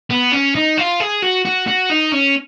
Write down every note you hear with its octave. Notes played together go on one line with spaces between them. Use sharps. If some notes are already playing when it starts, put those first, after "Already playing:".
B3
C#4
D#4
F4
G#4
F#4
F#4
F#4
D#4
C#4